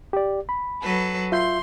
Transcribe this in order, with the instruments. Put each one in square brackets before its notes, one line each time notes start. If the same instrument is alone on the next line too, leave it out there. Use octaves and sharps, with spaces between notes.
[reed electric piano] G4 D5
B5
[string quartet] F#3 A4 B4
[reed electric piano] F4 E5 G6 [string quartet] C6